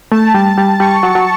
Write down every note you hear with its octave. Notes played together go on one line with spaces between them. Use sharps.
A3 A5
G3
G3
G3 C#6
F#3
F#3